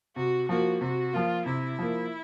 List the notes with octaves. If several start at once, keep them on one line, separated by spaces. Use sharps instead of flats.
C3 F#4
F3 A#3 F#4
C3 F#4
F3 A#3 F4
C3 E4
F3 A#3